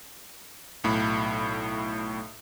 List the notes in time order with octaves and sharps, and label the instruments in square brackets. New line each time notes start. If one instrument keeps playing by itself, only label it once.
[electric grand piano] B1 A2 B5